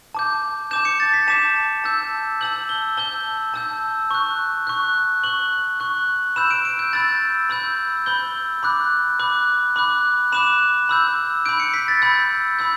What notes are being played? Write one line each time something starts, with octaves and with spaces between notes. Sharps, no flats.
A5 D6 G6
A5 D6 G6 E7
C#7
A6
B6
A5 D6 G6 E7
A5 E6 G6
A5 E6 G6 F#7
G7
A5 E6 G6 G7
A5 E6 G6
C#6 F#6
C#6 F#6
C#6 F#6 F#7
C#6 F#6
B5 E6 G6 E7
D7
D7
G6
B5 E6 G6 A6
B5 E6 G6
B5 E6 G6 G7
B5 D6 F#6
B5 D6 F#6
B5 D6 F#6
B5 D6 F#6 E7
B5 E6 G6
B5 E6 G6 D7
C#7
B6
A6
B5 E6 G6
B5 E6 G6